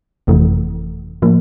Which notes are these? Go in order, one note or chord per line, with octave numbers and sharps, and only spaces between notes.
G1 F2 C3 E3 A3
A2 F3 A#3